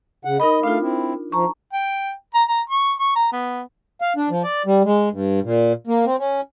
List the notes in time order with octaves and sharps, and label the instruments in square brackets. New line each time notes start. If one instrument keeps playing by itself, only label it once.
[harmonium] C#3 F#5
[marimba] D#4 A#4 B5 [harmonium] D#5
[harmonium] A3 F5 [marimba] D4 F4
[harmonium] C4 E4
[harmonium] F3 [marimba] A5 A#5 C#6
[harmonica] G5
A#5
A#5
C#6
C#6
A#5
B3
[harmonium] F5
D4
F3
D5
G3
G#3
G2
A#2
A#3
C4
C#4